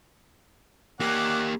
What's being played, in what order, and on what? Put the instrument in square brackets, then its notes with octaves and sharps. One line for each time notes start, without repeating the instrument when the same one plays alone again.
[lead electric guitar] A#3 G4 [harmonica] C#4 D5 F#5